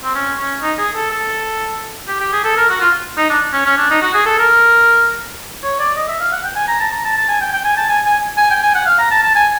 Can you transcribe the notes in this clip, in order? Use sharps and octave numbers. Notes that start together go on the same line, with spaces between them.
C4
C#4
C#4
D#4
G#4
A4
A4
G4
G4
G#4
A4
A#4
F#4
F4
D#4
D4
C#4
C#4
D4
D#4
F#4
G#4
A4
A#4
C#5
D5
D#5
E5
F5
F#5
G5
G#5
A#5
A5
A#5
A5
A5
G#5
G5
G5
G#5
A5
G#5
G#5
G#5
G5
G#5
F#5
F5
A#5
A5
A5
G#5